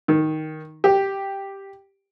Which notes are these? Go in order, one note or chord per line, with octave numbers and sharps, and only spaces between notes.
D#3
G4